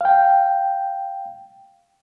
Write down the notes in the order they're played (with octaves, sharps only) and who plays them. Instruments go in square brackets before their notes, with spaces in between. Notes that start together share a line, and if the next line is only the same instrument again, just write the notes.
[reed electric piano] F5 G5